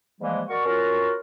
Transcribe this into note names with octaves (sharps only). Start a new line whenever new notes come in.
G#2 E3 F3 G3 G#3 A#3
F#4 A#4 D5 C#6
C#4 F4 F#4 A#4